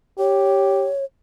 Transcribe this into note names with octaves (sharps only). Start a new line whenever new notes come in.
G4 C#5